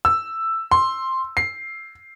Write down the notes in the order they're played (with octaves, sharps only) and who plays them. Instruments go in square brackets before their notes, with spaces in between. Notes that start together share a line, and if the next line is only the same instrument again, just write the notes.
[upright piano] E6
C6
C7